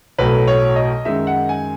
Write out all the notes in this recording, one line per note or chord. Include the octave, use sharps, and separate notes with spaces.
B1 A2 F#3 A3 B4
C#5
D#5
F#2 D#3 G#3 E5
F#5
G#5